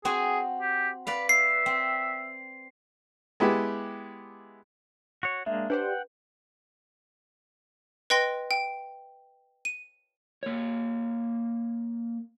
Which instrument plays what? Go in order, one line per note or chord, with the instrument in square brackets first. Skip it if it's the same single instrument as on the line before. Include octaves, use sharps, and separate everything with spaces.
[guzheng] C4 F#4 G#5 [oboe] G#4
[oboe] G4
[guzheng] B4 D5 F5 [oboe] B5
[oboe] E5 [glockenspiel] C7
[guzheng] C4
[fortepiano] G#3 B3 E4 G4
[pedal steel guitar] F#4 C#5
[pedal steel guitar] G#3 A#3 D4 [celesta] E5
[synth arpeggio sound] D4 G4 C5 [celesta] B4 [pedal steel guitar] F#5 G5
[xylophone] B4 D#5 G5 C6 A#6
G5
D#7
[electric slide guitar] A#3 C#5